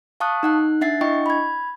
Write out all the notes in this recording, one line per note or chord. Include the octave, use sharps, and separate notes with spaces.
F5 A5 C#6 D#6 F#6
D#4 F#5 F#6
D4 E5 F#5 A6 C7
D4 E4 D#5 G5 C#6
B5 G#6